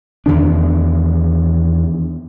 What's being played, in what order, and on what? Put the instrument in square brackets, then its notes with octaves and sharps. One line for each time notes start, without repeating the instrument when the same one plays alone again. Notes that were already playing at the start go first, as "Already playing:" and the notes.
[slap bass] E2 D#3 D4